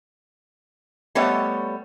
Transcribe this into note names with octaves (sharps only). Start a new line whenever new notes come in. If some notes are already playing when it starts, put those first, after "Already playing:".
G3 A3 B3 C#5 D#5